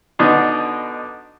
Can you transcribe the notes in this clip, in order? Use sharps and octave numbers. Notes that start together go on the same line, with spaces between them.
B2 D3 D4 D#4